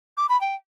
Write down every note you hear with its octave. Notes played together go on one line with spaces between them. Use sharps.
D6
B5
G5